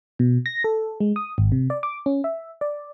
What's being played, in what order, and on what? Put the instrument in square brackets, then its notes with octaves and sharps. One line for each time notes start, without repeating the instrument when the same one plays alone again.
[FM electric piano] B2
A#6
A4
G#3
D#6
G#1
C3
D5
D6
C#4
E5
D5